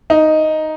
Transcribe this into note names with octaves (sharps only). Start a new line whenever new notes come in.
D#4